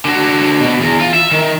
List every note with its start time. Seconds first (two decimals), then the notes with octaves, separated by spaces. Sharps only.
0.05 D3 F#4
0.61 B2
0.80 E2
1.00 F4
1.13 E5
1.31 D#3